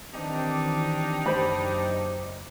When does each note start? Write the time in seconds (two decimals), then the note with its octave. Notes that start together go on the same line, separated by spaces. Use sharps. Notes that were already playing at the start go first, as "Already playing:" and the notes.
0.14 D#3 E3 C4 D4 D#4 G4
1.26 F#1 F#3 C5 B5